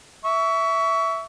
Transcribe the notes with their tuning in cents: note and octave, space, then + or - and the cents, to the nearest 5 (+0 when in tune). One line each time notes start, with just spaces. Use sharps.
E5 +0 C#6 +30